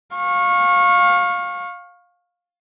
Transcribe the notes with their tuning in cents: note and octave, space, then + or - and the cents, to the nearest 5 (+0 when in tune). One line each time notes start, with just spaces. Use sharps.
F5 +20 C#6 -20